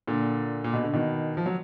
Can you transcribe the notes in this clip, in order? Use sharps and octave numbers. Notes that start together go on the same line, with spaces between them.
A#2 D3
A#2
B2
D3
B2 D#3
F3
F#3